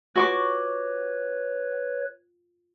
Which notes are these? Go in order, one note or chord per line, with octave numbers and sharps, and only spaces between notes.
F4 F#4 B4 C#5 F#5 C#6 D6